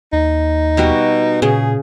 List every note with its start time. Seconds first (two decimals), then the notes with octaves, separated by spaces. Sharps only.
0.13 D#2 D#4
0.77 B2 G3 F#4
1.42 A#2 C#3 G#4